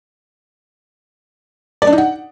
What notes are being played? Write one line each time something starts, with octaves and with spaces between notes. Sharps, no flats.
D5
D4
D#4
F#5